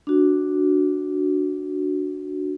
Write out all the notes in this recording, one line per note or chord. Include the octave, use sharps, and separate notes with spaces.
D4 F#4